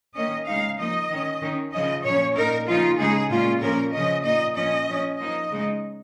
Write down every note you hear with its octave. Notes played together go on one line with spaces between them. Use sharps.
D#3 A#3 C#4 D#5
C#3 G#3 D#4 F5
F3 A#3 D#4 D#5
D#3 C#4
D#3 C#4
C#3 F3 C#4 D#5
A#2 F3 C#4 C#5
A#2 A#3 D#4 A#4
C#3 F3 A#3 D#4 F4
C#3 G#3 D#4 G#4
A#2 G#3 C#4 F4
A#2 F3 A#3 C#4 A#4
C#3 F3 C#4 D#5
A#2 A#3 D#4 D#5
A#2 F3 C#4 D#5
F3 C#4
F3 A#3 D#4 D#5
C#3 G#3 D#4